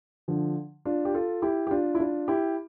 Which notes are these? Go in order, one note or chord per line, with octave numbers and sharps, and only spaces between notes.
D3 F3
D4 F4
G4
F4 A4
E4 G4
G4
D4 F4
E4
D4 F4
E4 G4